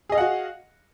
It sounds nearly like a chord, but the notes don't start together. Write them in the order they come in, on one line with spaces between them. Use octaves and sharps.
G#4 D#5 F5 F#5 F#4